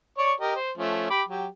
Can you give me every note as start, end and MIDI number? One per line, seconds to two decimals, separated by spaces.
0.18 0.33 73
0.18 0.33 74
0.18 0.33 85
0.40 0.55 67
0.40 0.55 70
0.40 0.55 75
0.56 0.71 72
0.78 1.06 53
0.78 1.06 57
0.78 1.06 61
1.10 1.23 67
1.10 1.23 83
1.10 1.23 86
1.28 1.47 54
1.28 1.47 67